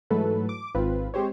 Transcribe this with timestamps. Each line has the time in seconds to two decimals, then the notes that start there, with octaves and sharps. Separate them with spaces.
0.10 G#2 E3 F#3 A3 A4 B4
0.49 D6
0.75 G#1 C4 F4 B4
1.14 G#3 C4 G4 C5 C#5